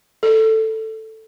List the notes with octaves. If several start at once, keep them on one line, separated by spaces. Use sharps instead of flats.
A4